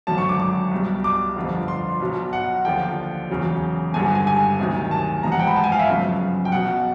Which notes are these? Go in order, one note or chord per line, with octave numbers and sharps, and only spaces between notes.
G#1 F#2 D3 F#3 A5
C#6
D6
D6
C2 B2 G3
D6
G1 F2 D3 F3
C6
B1 B2 F#3
F#5
D#2 D3 F3 G5
E1 E2 C#3 F#3
G#1 G2 D3 G3 G#5
G#5
G#5
D2 C3 D#3 F#3
A5
A1 G#2 F3 A#5
F#5
G5
B5
A5
G#5
F5
E5
G1 F#2 C#3 F3
G5
B1 B2 F#3 F#5